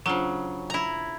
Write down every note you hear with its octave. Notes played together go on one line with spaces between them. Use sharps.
C#3 F#3 D4 F4 C5
E4 A#5